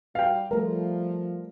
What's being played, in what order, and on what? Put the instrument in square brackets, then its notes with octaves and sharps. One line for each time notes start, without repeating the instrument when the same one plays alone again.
[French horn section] G3 [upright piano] F5 G5
[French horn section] F3 [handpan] G3 A3 [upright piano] A#4